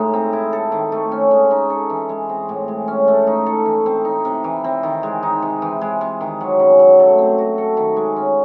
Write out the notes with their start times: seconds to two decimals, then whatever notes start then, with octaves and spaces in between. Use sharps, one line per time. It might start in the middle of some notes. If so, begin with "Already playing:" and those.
Already playing: A2 G#3 D#4
0.14 C4
0.33 E4
0.53 A4
0.72 D#3
0.92 A3
1.12 C#4
1.31 G#3
1.51 D#4
1.70 A4
1.90 E3
2.09 G#3
2.29 C4
2.49 A2
2.68 G#3
2.88 C#4
3.08 A3
3.27 D#4
3.46 A4
3.66 E3
3.86 C4
4.05 D#4
4.25 C3
4.44 E3
4.64 C4
4.83 D#3
5.03 G#3
5.23 D#4
5.42 C3
5.62 E3
5.81 G#3
6.01 C3
6.21 D#3
6.41 F#3
6.59 C#3
6.79 F#3
6.99 A3
7.18 C4
7.38 F#4
7.58 A4
7.77 D#3
7.97 G#3
8.16 C#4